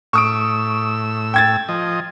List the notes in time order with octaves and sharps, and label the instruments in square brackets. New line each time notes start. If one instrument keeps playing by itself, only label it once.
[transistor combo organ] A2 E6 [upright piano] C#6 D#6 D7
[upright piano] G5 G#6 A6
[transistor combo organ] F3 D#5